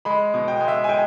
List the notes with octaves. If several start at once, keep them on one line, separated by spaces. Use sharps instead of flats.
G#3 B5
B2
G5
G#3
E5
G#5
G#3 G5